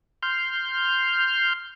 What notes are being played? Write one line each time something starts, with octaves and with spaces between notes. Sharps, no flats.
C6 F6 G6